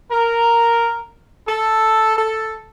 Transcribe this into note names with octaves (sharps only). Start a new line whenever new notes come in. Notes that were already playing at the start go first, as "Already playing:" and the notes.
A#4
A4
A4